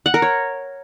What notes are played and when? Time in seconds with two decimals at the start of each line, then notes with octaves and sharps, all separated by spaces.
0.06 F#5
0.14 A#4
0.22 C#5